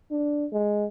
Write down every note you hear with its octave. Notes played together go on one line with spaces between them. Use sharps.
D4
G#3